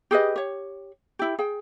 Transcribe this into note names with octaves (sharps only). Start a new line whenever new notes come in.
G4 G#4 B4 D#5
G4 C#5
E4 G4
G#4 G5